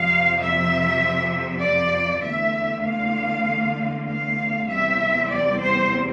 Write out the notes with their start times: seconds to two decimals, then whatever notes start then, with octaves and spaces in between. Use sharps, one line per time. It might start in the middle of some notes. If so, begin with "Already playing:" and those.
Already playing: F2 C3 F3 F5
0.40 E5
1.63 D5
2.24 E2 D3 A3 E5
2.85 F5
4.08 F5
4.70 E2 C3 G3 C4 E5
5.32 D5
5.62 C5